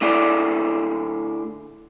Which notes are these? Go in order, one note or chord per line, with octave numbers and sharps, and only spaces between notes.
D3 A3 E4 G#4 D5